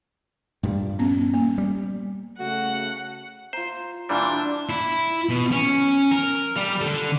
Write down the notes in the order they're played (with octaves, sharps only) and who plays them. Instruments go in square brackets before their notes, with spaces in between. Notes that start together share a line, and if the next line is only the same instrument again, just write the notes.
[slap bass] G2 A#2 G3
[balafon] B3 C#4
A#3
[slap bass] G3
[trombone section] C#3 A3 [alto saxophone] F#4 [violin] F#5
[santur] F4 A#5 [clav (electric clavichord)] C5
[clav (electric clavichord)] A#2 E3 G3 [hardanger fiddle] D4 [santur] E4 F4 F#5
[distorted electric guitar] E4
B2
C#4
A#4
G3
D3 A4